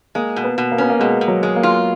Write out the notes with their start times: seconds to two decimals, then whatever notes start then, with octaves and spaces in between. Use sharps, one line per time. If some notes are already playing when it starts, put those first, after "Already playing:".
0.15 G#3 A#3
0.36 B2
0.44 B3
0.58 B2
0.72 A#3
0.78 B3 C#4
0.90 A#3
0.99 B2 G#3
1.21 B2
1.28 F#3
1.43 G#3
1.56 A#3
1.63 F4